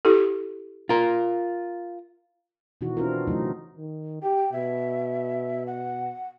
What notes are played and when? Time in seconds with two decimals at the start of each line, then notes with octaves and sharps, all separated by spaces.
0.05 E4 G4 A4
0.89 F4 A#4
2.81 B2 D#3 E3 D#4 F#4
2.97 C4 D4 E4 F4 A#4
3.27 C#3 E3 F#3 A3 C4 D#4
3.78 D#3
4.23 G4 G5
4.53 B2 E5
5.67 F#5